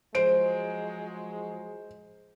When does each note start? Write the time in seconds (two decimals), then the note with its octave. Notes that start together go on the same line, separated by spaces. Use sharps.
0.15 F3 F#3 G#3 C5 D7